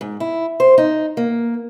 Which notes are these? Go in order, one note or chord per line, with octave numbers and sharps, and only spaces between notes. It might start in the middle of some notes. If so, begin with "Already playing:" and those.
G#2
E4
C5
D#4
A#3